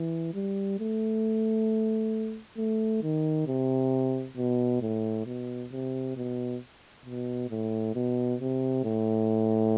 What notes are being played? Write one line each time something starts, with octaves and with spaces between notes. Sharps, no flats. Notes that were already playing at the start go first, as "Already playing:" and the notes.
Already playing: E3
G3
A3
A3
D#3
C3
B2
A2
B2
C3
B2
B2
A2
B2
C3
A2